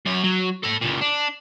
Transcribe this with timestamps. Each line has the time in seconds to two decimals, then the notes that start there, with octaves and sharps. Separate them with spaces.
0.06 F#2 C#5
0.23 F#3
0.63 A4 B5
0.81 C#2 A#2
1.01 D4